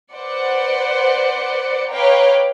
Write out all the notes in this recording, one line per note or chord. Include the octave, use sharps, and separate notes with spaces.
B4 C5 D5 F#5 C#7
B4 C#5 F5 G5 A#5 D6